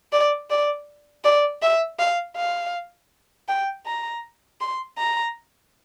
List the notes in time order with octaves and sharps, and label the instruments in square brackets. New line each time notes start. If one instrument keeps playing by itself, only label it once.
[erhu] D5
D5
D5
E5
F5
F5
G5
A#5
C6
A#5